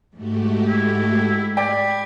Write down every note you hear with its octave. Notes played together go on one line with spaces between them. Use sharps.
G#2 A3 F#4 G4
E4
D5 G5 B5 G#6